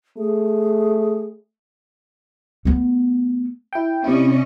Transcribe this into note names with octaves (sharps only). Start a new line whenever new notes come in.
A3 G#4
A3 B3
E4 G5
C3 C#4 E4 D5 D#5